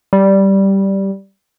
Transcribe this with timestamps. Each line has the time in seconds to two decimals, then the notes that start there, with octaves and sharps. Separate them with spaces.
0.13 G3